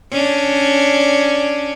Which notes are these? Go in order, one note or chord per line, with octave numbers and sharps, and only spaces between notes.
C#4 D4